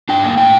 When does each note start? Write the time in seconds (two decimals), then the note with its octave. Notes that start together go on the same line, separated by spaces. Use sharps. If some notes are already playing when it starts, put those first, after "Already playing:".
0.09 D4 G5
0.24 A#3
0.38 A2 G5